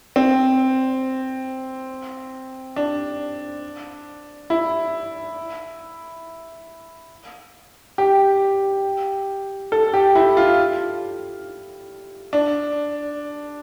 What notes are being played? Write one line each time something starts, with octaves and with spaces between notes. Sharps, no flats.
C4
D4
E4
G4
A4
G4
E4
F4
D4